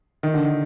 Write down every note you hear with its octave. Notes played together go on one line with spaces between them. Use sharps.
D#3
D3
D#3